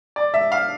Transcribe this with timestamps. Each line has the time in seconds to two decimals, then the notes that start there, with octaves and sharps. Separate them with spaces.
0.16 D5
0.34 E5
0.52 F5